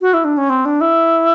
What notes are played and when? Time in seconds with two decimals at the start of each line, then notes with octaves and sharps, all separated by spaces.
0.02 F#4
0.14 E4
0.25 D4
0.38 C#4
0.50 C4
0.65 D4
0.81 E4